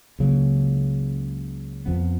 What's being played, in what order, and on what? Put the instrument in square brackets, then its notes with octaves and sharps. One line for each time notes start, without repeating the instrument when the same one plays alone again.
[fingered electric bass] C#2 C#3 F#3 A#3
F2 F3 B3